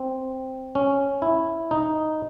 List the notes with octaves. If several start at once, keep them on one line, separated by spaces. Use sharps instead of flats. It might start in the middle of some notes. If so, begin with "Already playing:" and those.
Already playing: C4
C#4
E4
D#4